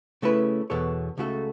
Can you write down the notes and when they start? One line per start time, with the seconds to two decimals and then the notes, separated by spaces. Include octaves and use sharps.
0.22 C#3 A3 C#4 E4 B4
0.70 E2 B2 B3 A4 C#5
1.17 C#2 C#3 A3 F#4 A4